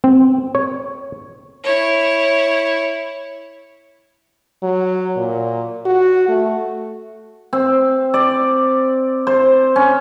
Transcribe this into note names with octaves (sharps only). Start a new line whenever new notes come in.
C4
C#5
E4 C#5
F#3
A#2
F#4
A3
C4
D5
C5
C#4